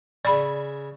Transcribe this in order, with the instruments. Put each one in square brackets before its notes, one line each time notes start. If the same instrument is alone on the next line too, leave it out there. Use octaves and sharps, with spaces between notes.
[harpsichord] C#3 E5 G#5 [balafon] D5 B5